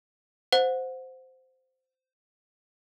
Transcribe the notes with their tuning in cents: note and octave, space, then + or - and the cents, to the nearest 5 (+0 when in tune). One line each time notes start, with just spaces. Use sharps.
C5 -10 F#5 -30